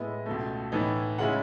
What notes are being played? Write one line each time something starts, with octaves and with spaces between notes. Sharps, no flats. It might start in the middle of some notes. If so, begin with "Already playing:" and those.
Already playing: A2 G#3 B3 E4 D#5
C#2 B2 A3
A2 E3 B3 D#4
C#3 G#3 C#4 E4 F#5